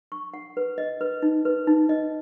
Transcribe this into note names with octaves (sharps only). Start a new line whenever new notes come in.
C#6
F#5
B4
D#5
B4
D#4
B4
D#4
D#5